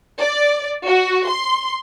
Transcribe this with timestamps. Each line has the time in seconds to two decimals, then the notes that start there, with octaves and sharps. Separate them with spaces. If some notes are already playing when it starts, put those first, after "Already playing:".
0.19 D5
0.85 F#4
1.27 C6